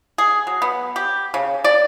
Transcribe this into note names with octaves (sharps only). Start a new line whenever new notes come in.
G#4
F#3
B3
G4
C#3
D5